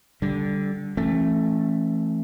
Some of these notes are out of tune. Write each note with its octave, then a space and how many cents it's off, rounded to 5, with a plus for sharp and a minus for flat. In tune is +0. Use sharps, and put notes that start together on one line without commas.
D3 -15 G3 +0
E3 +30 A3 +0 C#4 -35